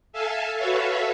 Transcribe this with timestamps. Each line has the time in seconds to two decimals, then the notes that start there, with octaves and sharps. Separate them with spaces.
0.13 A4 E5 F5 G#5 A5
0.57 F#4 A4 B4 C#5 E5 F5